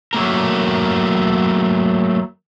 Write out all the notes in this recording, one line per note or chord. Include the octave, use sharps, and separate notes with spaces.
F#3 A3 A#3 A#4